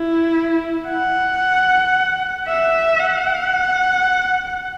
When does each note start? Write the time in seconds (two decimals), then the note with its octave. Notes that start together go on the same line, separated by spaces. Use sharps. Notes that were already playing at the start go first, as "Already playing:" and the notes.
Already playing: E4
0.88 F#5
2.47 E5
3.00 F#5